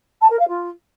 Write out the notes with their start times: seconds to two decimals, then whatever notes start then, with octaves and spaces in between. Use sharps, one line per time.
0.21 A5
0.30 A#4
0.39 F5
0.48 F4